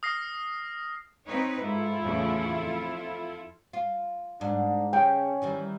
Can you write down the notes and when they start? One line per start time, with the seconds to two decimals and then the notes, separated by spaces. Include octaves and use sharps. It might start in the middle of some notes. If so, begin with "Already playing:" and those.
0.03 D#6 F6 A#6 C7
1.25 C4 D#4 B4 C#5
1.60 G#2 E4 F4 A4
2.02 E2 A2 C#3
2.54 F2
3.73 F4
4.41 G#2 D4
4.93 C#3 C#4 G5
5.42 D#3 E3 G3